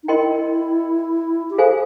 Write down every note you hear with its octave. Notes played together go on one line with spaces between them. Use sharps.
D#4
E4 A#4 D#5 G5 C6
G4
G#4 A4 C5 F5 G#5